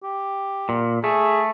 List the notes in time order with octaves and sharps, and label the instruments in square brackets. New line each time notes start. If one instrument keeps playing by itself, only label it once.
[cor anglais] G4
[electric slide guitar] A#2
[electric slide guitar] A3 [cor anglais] G#4